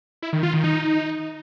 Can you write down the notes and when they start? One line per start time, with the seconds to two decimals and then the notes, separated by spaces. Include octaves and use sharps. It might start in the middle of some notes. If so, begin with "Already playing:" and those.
0.22 E4
0.33 D#3
0.43 F4
0.53 D#3
0.64 D#4